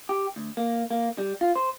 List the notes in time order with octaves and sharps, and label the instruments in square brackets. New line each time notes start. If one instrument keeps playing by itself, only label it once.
[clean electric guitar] G4
D2
A#3
A#3
G3
F4
C5